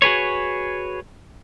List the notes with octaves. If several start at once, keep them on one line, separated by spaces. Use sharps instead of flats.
F#4 G#4 B4 C#5